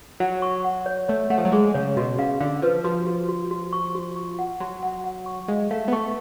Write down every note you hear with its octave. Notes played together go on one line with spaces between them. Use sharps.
F#3 F#5
C#6
F#5
C#5
A3 C#5
A3 F#5
F3
F#3
G#3 G#4
C#3 C#5
B2 F#4
C#3 F5
D3 F5
F3 B4
F3 F#4
F#4
F#4
F#4
C#6
F#4
C#6
F#5
F#3 F#4
F#5
F#5
C#6
G#3 F5
A3 F5
B3
A3 C#6